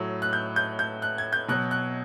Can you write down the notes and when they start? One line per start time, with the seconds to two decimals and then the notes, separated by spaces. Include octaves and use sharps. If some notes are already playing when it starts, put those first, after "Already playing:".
Already playing: A2 F#3
0.22 F#6
0.33 G6
0.56 G6
0.79 G6
1.02 F#6
1.18 G#6
1.33 G6
1.48 B2 F#3 F#6
1.71 F#6